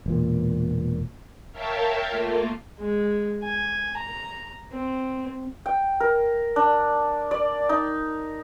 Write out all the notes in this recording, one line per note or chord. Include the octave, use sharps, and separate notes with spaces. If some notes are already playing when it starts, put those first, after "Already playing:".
E1 A#2
A#4 C#5 E5 F5 G5 A5
A3 A#3 F4
G#3
G#5
A#5
C4
G5
A#4
D4
D5
D#4